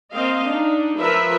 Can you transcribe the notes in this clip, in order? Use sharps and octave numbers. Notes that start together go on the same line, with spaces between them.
A#3 C4 D#5 F5
D4 D#4
F3 A#4 B4 E5